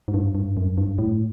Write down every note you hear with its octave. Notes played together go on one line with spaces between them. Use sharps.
G#2
G2
G2
F#2
G2
A2